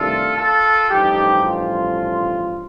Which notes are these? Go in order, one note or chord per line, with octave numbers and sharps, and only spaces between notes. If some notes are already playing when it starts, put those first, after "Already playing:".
Already playing: C2 C3 D#3 A3 D4 F4 A4
F4 A4
A1 G2 F3 D#4 G4
F4